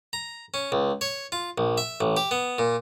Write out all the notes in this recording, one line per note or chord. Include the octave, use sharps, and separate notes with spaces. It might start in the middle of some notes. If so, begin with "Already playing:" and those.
A#5
C#4
C#2
C#5
F4
A#1
E5
A1
G4
B3
A#2